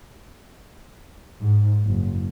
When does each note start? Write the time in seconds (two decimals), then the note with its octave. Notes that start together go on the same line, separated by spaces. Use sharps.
1.40 G#2
1.85 F#1